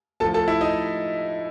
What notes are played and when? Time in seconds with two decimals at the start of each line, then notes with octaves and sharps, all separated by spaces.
0.20 A2 F3 A4 A5
0.34 A4 A5
0.48 E4 E5
0.61 D#4 D#5